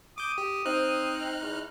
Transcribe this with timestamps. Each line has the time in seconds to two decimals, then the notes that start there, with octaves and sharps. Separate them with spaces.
0.18 D6 D#6 G6
0.38 G4
0.66 C4 D#4 F6 F#6
1.42 E2